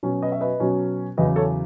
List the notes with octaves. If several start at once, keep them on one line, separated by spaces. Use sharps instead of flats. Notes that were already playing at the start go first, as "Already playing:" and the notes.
B2 F#3 C#4
B4 D#5
E5
B4 D#5
B2 F#3 C#4
E2 C#3 F#3 B4 D#5
A4 C#5